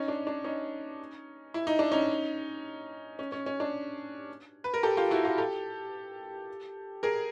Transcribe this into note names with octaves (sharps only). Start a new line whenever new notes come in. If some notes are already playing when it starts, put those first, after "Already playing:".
Already playing: C#4 D#4
D4
D4
C#4 D#4
E4
D#4
D4
C#4 D#4
C#4
C#4
C#4
D4
B4
A#4
G4 A4
F4 G4
E4 F#4
F4 G4
G4 A4
G#4 A#4